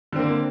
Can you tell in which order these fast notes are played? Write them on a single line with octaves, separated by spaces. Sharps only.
D3 C4 A#3